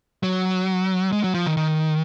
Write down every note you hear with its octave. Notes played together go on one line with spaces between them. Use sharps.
F#3
G#3
F#3
F3
D#3
D#3